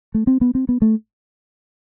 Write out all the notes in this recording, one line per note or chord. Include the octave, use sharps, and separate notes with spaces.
A3
C4
B3
C4
B3
A3